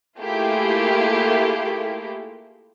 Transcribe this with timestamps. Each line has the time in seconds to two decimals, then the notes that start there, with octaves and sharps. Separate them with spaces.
0.21 A3 A#3 E4 F4 G4 G#4